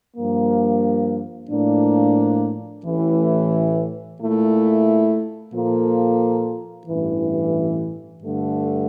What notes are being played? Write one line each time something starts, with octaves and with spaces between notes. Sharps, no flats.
G2 F3 A#3
A2 F3 A#3 D4
A1 A2 E3
A#2 A3 E4
A#2 F3 A#3 F4 A4
A1 G2 E3
G2 D3 A3